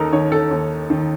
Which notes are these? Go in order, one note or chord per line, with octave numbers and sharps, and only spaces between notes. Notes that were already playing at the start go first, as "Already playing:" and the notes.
Already playing: D#2 D#4 A4 A#4
D#3 C#5
A4
D#2
D#3